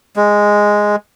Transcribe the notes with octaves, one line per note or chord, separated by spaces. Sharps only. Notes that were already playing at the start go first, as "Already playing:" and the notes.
G#3